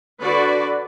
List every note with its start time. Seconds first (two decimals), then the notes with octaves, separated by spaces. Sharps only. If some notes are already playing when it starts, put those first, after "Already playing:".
0.21 D3 F#4 B4 D5